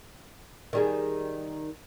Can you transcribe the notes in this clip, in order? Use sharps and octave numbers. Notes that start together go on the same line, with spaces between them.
D#3 G3 G#4